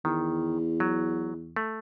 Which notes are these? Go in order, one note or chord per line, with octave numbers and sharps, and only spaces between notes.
E2 D#3
F#3
A3